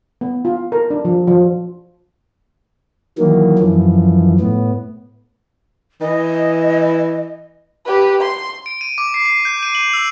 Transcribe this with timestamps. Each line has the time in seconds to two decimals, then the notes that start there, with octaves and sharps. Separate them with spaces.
0.21 B3
0.45 F4
0.72 A#4
0.90 D4
1.05 F3
1.27 F3
3.18 D#3 E3 F#3 A#3
3.59 F#2 E3 F3
4.40 A2 B3
6.01 E3 D#5
7.85 G4 B4
8.21 C6
8.66 D7
8.81 D#7
8.98 D6
9.14 C7
9.26 C7
9.45 G6
9.63 D#7
9.75 F#7
9.93 E6